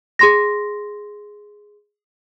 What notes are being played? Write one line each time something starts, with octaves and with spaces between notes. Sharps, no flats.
G#4 C6 A#6